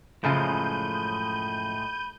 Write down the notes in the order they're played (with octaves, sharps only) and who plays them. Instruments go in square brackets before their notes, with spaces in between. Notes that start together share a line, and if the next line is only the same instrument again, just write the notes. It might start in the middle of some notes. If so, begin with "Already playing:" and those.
[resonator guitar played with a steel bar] F#2 C#3 F3 [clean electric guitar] A2 G#3 [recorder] B5 [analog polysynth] G6 D#7